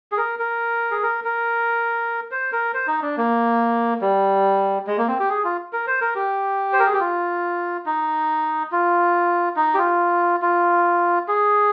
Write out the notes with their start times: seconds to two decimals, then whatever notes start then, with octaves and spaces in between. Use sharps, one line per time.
0.12 G#4
0.17 A#4
0.39 A#4
0.91 G#4
1.03 A#4
1.24 A#4
2.31 C5
2.52 A#4
2.74 C5
2.87 D#4
3.03 D4
3.17 A#3
4.02 G3
4.87 G#3
4.98 A#3
5.08 C4
5.20 G4
5.30 G#4
5.44 F4
5.73 A#4
5.87 C5
6.01 A#4
6.15 G4
6.73 C5
6.80 A#4
6.86 G#4
6.93 G4
7.00 F4
7.86 D#4
8.72 F4
9.56 D#4
9.74 G4
9.78 F4
10.42 F4
11.28 G#4